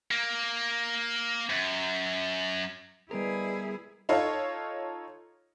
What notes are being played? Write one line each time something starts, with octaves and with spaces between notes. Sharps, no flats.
A#3
F#2
G3 B3 E4 G#4 A#4 B4 D5 D#5
D#4 F4 A4 C#5 F5